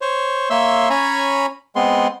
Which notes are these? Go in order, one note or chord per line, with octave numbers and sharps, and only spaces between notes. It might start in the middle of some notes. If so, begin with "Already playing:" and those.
C5 C#5
A#3 C#5 E5 C6 E6
C#4 C#5 G#5 A#5 B5
G#3 B3 C4 C6